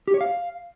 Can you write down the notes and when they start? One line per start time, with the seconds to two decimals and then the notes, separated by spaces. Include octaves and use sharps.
0.08 G4
0.14 C#5
0.21 F5